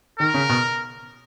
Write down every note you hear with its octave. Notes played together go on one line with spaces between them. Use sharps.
D#3 A#4
C#3
B2